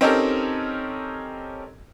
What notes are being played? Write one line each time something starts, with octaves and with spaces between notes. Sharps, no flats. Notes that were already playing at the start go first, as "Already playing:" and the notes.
C4 C#4 D#4 G4 A4 A#4